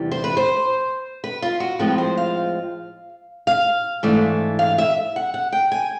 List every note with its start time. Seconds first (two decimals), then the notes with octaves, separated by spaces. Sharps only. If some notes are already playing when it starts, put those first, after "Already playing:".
Already playing: E2 C3 E3 G3
0.11 C5
0.24 B4
0.37 C5
1.24 B4
1.42 F4
1.60 F#4
1.79 A2 F3 G#3 C4 F4 B4
1.98 C5
2.17 F5
3.47 F5
4.03 G#2 E3 A3 D4
4.59 F5
4.78 E5
5.16 F#5
5.34 F#5
5.52 G5
5.72 G#5